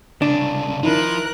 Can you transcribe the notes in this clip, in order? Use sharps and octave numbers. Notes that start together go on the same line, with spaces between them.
C2 C#3 D4
D#3 F3 E4 A#4 F#6